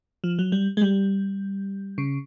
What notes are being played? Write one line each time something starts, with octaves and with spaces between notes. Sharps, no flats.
F3
F#3
G3
G#3
G3
C#3